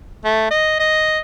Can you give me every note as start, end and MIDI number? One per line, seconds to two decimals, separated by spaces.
0.24 0.49 57
0.51 0.75 75
0.80 1.19 75